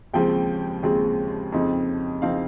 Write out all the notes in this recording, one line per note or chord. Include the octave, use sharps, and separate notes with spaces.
D#2 C#3 F3 G#3 C4 G5
D#2 C#3 F3 G#3 C4
F2 C#3 F3 C4 D#4
C#3 F3 C4 D#4 F5